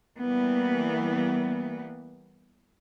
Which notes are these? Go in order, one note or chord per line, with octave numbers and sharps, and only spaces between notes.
E3 G3 A#3 B3